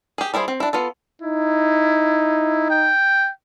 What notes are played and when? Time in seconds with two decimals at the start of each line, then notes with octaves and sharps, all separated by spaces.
0.18 G4 G#4
0.34 G3 E4 G#4 C5
0.48 C4
0.60 D4 E4
0.73 B3 F4 A4
1.22 D#4 E4
2.70 G5